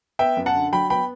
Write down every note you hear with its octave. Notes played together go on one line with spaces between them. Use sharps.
B3 E5 G5
F#2
F#5 A5
D3
F#3 G5 B5
B3 G5 B5